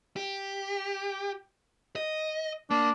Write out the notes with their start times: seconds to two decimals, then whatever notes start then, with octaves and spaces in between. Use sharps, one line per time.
0.16 G4
1.96 D#5
2.71 A#3 D4